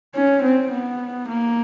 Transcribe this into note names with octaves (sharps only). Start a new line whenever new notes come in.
C#4
C4
B3
A#3